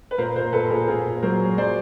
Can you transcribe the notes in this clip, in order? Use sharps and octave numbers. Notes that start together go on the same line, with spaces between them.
B4
A#2 A#4 C5
A#2 A#4 C5
A#2 A4 B4
A#2 G#4 A#4
A#2 G#4 A#4
A#2
F#3 A#4 C5
F#3
F#3 C5 D5